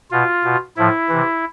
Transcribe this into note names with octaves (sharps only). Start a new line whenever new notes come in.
B2 F4
B2
A2 F3 E4
C3 E3